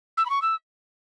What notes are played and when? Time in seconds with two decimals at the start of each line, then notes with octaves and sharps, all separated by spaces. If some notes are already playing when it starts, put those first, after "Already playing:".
0.17 E6
0.25 B5
0.29 C#6
0.42 E6